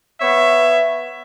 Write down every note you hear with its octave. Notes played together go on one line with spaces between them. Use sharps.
B3 C#5 E5